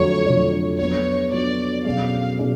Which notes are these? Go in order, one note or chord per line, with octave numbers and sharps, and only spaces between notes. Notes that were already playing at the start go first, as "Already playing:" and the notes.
Already playing: F2 D3 F#3 A3 D4 C#5
F2 D3 F#3 A3 D4
F#3 B3 D4 C#5
F#3 B3 D4 D5
B2 F#3 C#4 G#4 D5 F5
B2 F#3 C#4 G#4 D5